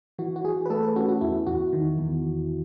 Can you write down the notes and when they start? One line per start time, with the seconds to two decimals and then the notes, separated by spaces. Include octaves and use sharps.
0.19 E3 F#4
0.36 F#4
0.44 E3 G#4
0.66 B4
0.70 A3 A4
0.83 B4
0.96 C#4 F#4
1.09 F#4
1.21 E2 E4
1.47 E2 F#4
1.73 D#3
1.98 E2